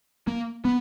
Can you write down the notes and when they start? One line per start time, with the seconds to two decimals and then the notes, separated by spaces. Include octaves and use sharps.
0.27 A#3
0.65 B3